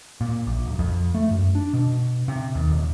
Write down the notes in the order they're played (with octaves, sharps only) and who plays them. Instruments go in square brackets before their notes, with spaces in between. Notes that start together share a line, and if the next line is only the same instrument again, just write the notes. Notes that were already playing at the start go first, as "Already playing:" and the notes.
[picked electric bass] A#2
A#1
D1
F2
A3
F#2
D4
B2
C3
D#2
D#1